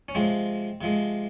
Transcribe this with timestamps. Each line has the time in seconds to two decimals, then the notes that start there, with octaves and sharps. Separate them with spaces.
0.09 C#4
0.15 C3 F3 G#3 C4
0.81 C3 F3 G#3